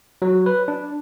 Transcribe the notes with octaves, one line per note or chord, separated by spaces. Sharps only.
F#3
B4
D4